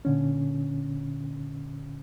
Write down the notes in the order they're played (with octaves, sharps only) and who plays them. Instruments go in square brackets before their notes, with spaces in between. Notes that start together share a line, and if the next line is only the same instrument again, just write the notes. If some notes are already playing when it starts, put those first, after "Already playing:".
[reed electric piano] A#2 D3 C#4